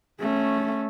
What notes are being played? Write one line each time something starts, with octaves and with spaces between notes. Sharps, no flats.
A3 C#4